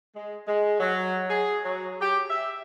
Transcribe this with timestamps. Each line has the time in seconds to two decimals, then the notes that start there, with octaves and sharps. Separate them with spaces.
0.16 G#3
0.48 G#3
0.80 F#3
1.30 G#4
1.64 F#3
2.02 G4
2.31 E5